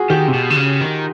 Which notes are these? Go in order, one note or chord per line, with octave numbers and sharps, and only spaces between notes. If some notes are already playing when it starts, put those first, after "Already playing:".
Already playing: F4 F#4 G#4
D#3 G4
C3
B2
D3
C#3
D#3